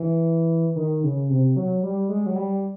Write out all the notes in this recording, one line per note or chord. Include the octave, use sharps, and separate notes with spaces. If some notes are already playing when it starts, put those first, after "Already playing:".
Already playing: E3
D#3
C#3
C3
F#3
G3
G#3
F#3
G3